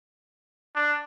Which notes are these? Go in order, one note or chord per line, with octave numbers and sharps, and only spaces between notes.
D4